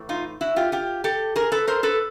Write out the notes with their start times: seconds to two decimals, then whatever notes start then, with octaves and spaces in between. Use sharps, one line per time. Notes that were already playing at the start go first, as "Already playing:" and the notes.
Already playing: A2 E3
0.09 D#4 F4
0.41 E4 F#4
0.56 F4 G4
0.72 F4 G4
1.04 G4 A4
1.36 G#4 A#4
1.52 A4 B4
1.68 A#4 C5
1.83 A4 B4